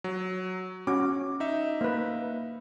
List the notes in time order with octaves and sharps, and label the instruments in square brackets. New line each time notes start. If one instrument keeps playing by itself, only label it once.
[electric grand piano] F#3
[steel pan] C#4 F#4 [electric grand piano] D6
[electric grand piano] D#4 E5
[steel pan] A#3 B4